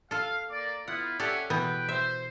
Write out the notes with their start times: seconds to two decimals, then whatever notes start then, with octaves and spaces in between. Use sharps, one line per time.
0.11 F4 A4 F5
0.50 A#3 D5
0.88 B3 E4 F4 F#5
1.20 C#4 G4 A4 D5 E5 F#5
1.50 B2 E3 B3 B4 G5
1.89 C5 E5